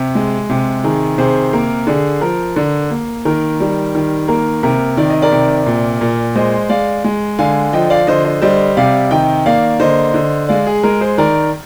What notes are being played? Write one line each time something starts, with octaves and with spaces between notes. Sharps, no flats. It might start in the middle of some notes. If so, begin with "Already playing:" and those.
Already playing: C3
G#3
C3
D#3 G#4
C3 G#4 C5
A#3 A#4
D3 G#4
F3 A#4
D3
A#3
D#3 A#4
G3
D#3
A#3 A#4
C3 A#4
D#3 D5
D#5
A#4 D5
C3
A#2
A#2
G#3 C5 D#5
G#3 D5 F5
G#3
D3 F5 G#5
F3 D#5 G5
D5 F5
D3 C5 D#5
C5 D#5
G3 C5 D#5
C3 D5 F5
D#3 D#5 G5
A#3 D5 F5
D3 C5 D#5
D3
G#3 D5 F5
G#4
G#3 A#4
G#4 C5
D#3 A#4 D5